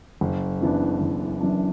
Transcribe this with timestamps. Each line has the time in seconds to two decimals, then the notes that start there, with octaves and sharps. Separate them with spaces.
0.21 F#1
0.61 F#2 E3 B3 D4
1.01 F#1
1.41 F#2 E3 B3 D4